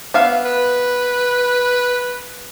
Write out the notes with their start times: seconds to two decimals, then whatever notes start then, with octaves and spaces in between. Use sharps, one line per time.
0.14 B3 E5 F5
0.46 B4